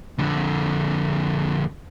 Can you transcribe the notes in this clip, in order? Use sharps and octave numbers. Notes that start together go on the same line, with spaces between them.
F2 D3